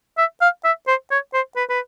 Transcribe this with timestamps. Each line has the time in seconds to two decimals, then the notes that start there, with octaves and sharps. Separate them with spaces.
0.18 E5
0.41 F5
0.64 E5
0.88 C5
1.11 C#5
1.34 C5
1.56 B4
1.70 B4